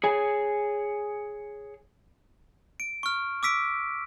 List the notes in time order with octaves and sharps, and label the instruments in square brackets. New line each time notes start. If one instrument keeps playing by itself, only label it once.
[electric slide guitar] G#4 C#5 G#5
[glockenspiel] D7
C#6 F6
D6 E6 B6 D7